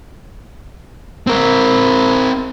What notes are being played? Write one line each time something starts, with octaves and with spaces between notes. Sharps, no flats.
C4 A#4